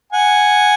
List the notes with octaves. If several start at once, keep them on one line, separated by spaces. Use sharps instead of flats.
F#5 G#5